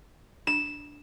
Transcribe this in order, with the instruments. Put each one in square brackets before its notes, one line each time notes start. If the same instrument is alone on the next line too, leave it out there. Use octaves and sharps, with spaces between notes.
[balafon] D4 [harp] E7